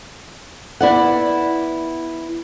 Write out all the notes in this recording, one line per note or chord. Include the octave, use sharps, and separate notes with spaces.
B3 E4 D5 F#5